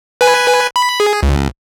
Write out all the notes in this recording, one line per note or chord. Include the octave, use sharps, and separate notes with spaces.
B4 G#5
B5
G#4
C#2